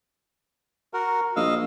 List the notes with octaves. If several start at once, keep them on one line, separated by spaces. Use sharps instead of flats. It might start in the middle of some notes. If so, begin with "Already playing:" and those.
F#4 A#4
A#1 D#5 F5 E6